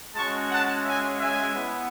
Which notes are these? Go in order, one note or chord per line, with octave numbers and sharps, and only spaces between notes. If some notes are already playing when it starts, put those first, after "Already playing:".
G#3 C#4 F#4 A5 C#6
F#5 A5
E5 G#5
E5 G#5
B3 E4